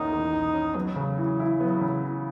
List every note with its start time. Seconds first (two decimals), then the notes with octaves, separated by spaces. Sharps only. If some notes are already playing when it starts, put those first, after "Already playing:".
Already playing: E2 D#3 A#3 C#4 D#4
0.12 E2
0.32 D#3
0.54 C#4
0.75 F#3 B3
0.96 C#3
1.18 E3
1.40 E4
1.60 F#3 B3
1.81 C#3
2.04 E3